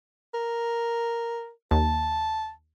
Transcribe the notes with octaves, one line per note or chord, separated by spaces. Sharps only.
A#4
D#2 A5